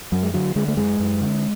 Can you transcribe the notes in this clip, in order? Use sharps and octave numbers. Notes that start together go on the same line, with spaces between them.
F#2 F#3
G#3
D3 F#3
D3 G#3
A3
F#2 G#3
F#2
D3